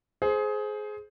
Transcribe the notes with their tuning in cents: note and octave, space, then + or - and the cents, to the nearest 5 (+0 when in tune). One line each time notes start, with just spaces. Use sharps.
G#4 +20 C5 +0